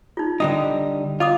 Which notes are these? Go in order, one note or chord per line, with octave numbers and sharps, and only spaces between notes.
D#4 F4
D3 G3 D#4 D#6
F4 D#5 D6 D#6